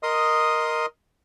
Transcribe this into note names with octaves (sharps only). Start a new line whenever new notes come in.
A#4 D#5 C6 D#6